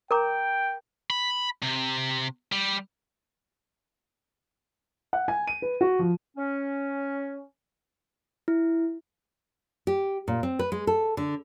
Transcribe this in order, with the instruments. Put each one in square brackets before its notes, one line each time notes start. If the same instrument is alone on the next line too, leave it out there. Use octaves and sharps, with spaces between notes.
[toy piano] A#4 A#5 D6 [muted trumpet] G5
[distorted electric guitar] B5
C3
G3
[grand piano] F#5
G#5
D#7
B4
F#4
F3
[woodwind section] C#4
[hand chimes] E4
[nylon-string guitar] G4
A#2
C4
B4
G#3
A4
D3